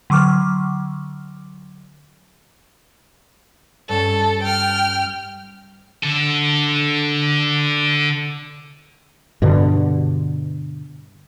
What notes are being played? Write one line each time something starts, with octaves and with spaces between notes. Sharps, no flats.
D3 F#3 C#6 D6 F6
G2 C#4 A4
G5 F6
D3 A4
G2 B2 D3